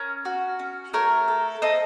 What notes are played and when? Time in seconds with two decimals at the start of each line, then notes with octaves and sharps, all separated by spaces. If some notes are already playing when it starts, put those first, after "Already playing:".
Already playing: C#4 A#4
0.25 F#4
0.59 C#4
0.94 A3 A#4 C#5
1.28 A4
1.62 A4 C5 D#5